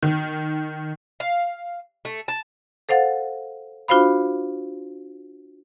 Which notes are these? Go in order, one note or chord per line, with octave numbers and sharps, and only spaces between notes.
D#3
F5
A3
A5
A4 C5 F5 F#5 A6
D4 F4 F#4 C5 F5 B5